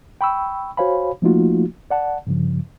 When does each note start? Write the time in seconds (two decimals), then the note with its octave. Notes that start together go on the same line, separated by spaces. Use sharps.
0.21 G5 B5 C#6 E6
0.77 F#4 C5 C#5 F5 G#5 B5
1.22 F3 A3 A#3 D#4 F4 F#4
1.91 D5 F#5 A5
2.27 G2 C#3 F3